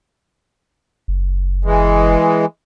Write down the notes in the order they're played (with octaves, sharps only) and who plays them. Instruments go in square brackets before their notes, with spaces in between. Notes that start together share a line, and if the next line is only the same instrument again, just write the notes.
[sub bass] F#1
[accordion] E3 G#3